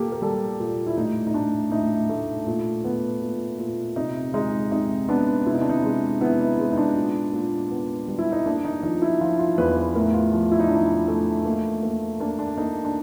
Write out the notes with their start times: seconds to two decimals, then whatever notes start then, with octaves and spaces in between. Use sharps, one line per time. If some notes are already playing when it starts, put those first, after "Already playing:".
Already playing: A#2 A#3 G4 A4
0.12 A#4
0.22 G3 A4
0.59 A#2
0.87 E4
0.97 A2 D#4
1.27 D#4
1.34 A2 D4
1.72 A2 D#4
2.09 A3
2.47 A#2
2.84 B3
3.22 A#2
3.59 A#2
3.96 C3 D#4
4.34 G#3 D#4
4.72 C3 D#4
5.09 B3 D4
5.46 C3 E4
5.54 D#4
5.61 D4
5.69 D#4
5.84 G#3
6.21 B3 E4
6.40 D#4
6.59 G#3
6.72 D#4
6.77 D4
6.96 A#2
7.33 A#2
7.71 B3
8.08 G3
8.19 E4
8.32 D#4
8.46 A#3 D4
8.65 D#4
8.83 F3 D#4
9.02 E4
9.21 F3 F4
9.39 F4
9.58 E2 B4
9.77 B4
9.95 A2 A#4
10.14 F4
10.33 F3
10.52 E4
10.60 D#4
10.67 F3 D4
10.76 D#4
11.08 A3
11.45 A#3
11.82 A#3
12.20 A#3 D4
12.39 D4
12.57 A#3 D#4
12.85 D4